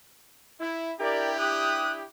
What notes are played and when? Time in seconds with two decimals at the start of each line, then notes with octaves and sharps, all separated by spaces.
0.59 E4
1.00 D4 E4 G4 A#4 D5
1.39 D#6 F#6